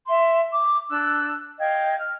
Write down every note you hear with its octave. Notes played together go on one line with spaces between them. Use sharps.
E5 C6
D6
D4 E6 F#6
D#5 F5 G5 G#6
F6